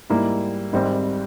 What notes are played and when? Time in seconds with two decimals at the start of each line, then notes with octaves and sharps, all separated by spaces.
0.10 G#2 G3 A#3 E4
0.73 G#1 G#2 G3 C4